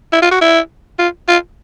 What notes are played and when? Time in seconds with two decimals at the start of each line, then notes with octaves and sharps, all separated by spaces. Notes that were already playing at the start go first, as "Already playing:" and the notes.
0.13 E4
0.22 F4
0.31 F#4
0.41 E4
0.99 F4
1.28 F4